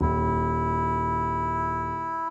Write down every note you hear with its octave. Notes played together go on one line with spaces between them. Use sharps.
D#1 E4